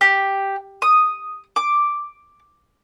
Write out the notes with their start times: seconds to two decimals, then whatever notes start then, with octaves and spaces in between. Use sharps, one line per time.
0.01 G4
0.82 D#6
1.56 D6